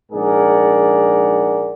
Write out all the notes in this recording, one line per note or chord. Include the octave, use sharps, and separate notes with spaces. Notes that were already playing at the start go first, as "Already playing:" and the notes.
A#1 G#2 G#4 A#4 D5 F#5